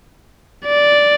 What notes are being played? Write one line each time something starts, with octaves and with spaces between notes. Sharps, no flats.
D5